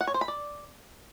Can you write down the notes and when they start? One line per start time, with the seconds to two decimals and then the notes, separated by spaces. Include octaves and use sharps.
0.01 F#5
0.07 C#5
0.14 C5
0.21 B5
0.28 D5